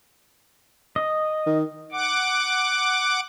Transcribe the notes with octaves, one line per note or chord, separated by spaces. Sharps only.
D#5
D#3
F#5 D6